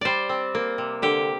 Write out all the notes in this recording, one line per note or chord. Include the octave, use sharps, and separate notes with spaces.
G3 C5 D5
C4
A#3
C3
D3 G4